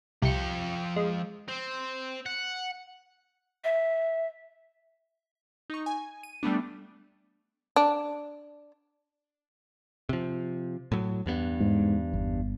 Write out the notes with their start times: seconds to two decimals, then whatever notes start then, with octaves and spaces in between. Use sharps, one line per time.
0.22 C2 F3 G5 C#7
0.96 G#3
1.49 C4
2.26 F#5
3.64 E5
5.70 D#4 C#6
5.86 G#5
6.23 D#7
6.43 G3 A3 B3 D4
7.76 D4
10.09 C3 F3
10.92 A2 F#3
11.26 E2 G2 B3
11.60 G#2
12.14 G1